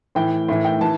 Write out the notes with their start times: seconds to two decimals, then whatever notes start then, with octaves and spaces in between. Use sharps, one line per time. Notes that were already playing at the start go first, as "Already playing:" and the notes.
0.15 A2 E3 G5
0.49 A2 E3
0.64 G5
0.81 E3 A5